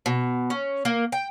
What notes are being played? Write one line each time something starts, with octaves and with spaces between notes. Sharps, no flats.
B2
C#4
A#3
G5